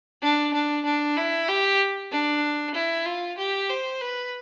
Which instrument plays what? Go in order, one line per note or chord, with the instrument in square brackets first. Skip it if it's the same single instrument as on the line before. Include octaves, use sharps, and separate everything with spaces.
[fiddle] D4
D4
D4
E4
G4
D4
E4
F4
G4
C5
B4